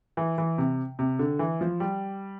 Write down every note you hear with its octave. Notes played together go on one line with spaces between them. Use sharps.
E3
E3
C3
C3
D3
E3
F3
G3